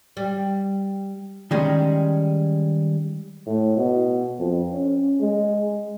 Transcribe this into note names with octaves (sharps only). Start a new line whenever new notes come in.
G3
D#3 G3 G#3 C#4
A2
B2
F2
C#4
G#3